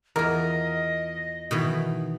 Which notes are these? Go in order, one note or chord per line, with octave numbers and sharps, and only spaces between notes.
E2 F3 A#4 D#5
B2 D#3 E3